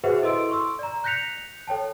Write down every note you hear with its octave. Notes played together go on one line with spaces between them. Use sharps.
F#4 G#4 B4 C5 E5 F#5
E4 A4 D#5 C6 E6 D7
C6 C#6 E6
D5 A#5
F#6 G6 A#6 B6 C#7 F7
A4 C#5 G5 A5